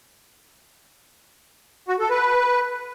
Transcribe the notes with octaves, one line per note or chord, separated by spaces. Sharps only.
F#4
A4
B4